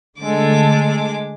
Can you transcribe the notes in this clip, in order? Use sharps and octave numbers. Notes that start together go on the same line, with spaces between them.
D3 G#3 A3 A4 D6